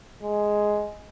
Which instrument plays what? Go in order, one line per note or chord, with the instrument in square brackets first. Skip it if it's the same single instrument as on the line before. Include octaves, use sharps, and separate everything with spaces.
[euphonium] G#3